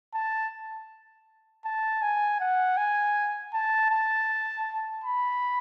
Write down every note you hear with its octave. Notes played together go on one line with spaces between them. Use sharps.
A5
A5
G#5
F#5
G#5
A5
A5
B5